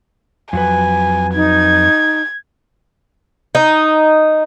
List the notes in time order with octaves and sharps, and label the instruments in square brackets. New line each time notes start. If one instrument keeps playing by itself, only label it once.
[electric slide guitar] F2 F#3 B4 [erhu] G#5
[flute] D#4 [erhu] G#6
[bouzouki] D#4